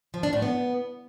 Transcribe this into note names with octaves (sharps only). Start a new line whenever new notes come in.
F3
D4
A2
B3